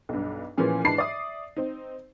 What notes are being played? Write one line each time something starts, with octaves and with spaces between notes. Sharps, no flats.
B1 G2
A#2 E3 F3 B3 C#4 G#4
G#2 E3 D4 A5 B5 C7
D5 E5 D#6
C4 D#4